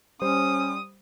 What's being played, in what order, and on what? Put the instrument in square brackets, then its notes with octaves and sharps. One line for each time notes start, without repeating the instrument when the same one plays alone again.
[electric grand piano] G3 C5 [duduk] C#4 [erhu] D#6